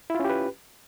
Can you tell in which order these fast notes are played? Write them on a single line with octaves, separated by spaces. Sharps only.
E4 F4 C#4 G4 B4